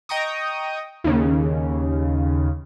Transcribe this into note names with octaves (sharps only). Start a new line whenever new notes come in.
D#5 G5 A#5 C#6 D#6
D#2 C#3